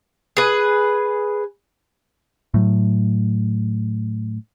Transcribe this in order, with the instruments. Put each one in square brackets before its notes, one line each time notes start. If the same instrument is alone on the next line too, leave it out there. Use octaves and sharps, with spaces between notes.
[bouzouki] G#4 B4
[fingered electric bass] A2 F#3